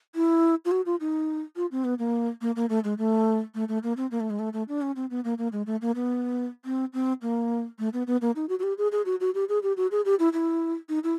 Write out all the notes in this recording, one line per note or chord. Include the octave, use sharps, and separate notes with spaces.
E4
F4
F#4
F4
D#4
F4
C4
B3
A#3
A#3
A#3
A3
G#3
A3
A3
A3
A#3
C4
A#3
A3
G#3
A3
A3
D4
C#4
C4
B3
A#3
A#3
G#3
A3
A#3
B3
C4
C4
A#3
A3
B3
B3
A#3
D#4
F#4
F#4
G4
G#4
G#4
F#4
F#4
G4
G#4
G4
F#4
G#4
G4
E4
E4
D#4
E4